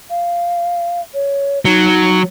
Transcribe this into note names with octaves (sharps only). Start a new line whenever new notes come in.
F5
C#5
F#3 D#4